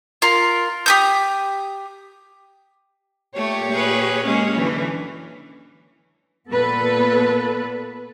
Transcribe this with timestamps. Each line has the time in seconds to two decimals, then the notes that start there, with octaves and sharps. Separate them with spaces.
0.22 F4 A#4
0.86 G4 D#6 G6
3.36 A#2 A3 G4 C#5
3.72 G#4 B4
4.25 G#3 A#3 C#4
4.58 F#2 D3 E3
6.51 A#2 B3 A4 B4